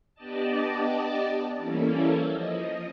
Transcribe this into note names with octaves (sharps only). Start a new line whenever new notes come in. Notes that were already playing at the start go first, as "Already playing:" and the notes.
B3 D4 G4 D5 D#5 A5
E3 G3 A#3 C#4 E4 A4
F3 D#5